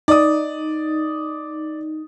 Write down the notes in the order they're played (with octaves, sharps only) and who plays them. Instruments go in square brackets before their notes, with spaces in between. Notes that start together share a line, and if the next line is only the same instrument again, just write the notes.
[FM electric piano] D#4 [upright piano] D5 D#6